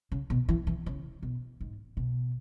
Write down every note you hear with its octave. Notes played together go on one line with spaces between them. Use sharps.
C#3
B2
E3
E3
C#3
B2
G#2
B2